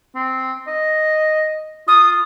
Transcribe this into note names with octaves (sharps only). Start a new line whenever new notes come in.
C4
D#5
F4 D#6